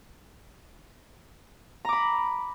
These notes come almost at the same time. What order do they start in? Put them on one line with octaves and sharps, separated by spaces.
A#5 D6 B5